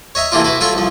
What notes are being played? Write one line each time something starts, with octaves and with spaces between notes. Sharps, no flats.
C#5 D#5 E5 A#5
A2 C3 E3 A#3 D4 F4
E4 F#4 B4
F#3 F4 A4 C#6
C2 F3